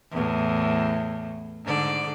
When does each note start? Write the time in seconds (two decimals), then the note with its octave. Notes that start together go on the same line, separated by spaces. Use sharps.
0.12 E2 A2
1.65 G#2 D3 D5